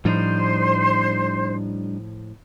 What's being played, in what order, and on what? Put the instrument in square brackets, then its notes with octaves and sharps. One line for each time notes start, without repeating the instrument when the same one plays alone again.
[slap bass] A2 F3 [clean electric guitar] G3 D4 D#4 [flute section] C5